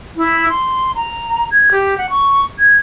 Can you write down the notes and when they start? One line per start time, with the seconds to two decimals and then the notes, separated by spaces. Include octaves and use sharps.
0.17 E4
0.49 C6
0.95 A#5
1.51 G#6
1.72 G4
1.98 F#5
2.10 C#6
2.59 G#6